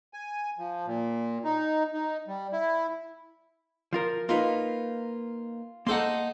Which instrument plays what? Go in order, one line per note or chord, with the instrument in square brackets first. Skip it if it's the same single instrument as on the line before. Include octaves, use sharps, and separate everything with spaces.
[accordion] G#5
F3
A#2
D#4
D#4
G3
E4
[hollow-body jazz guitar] F3 F4 A#4
[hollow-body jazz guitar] A#3 D#4 B4 [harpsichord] F4
[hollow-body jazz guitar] A#3 C5 F#5 [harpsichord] D#4 A4 C6